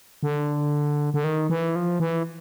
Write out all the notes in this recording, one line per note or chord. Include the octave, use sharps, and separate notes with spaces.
D3
D3
D#3
E3
F3
E3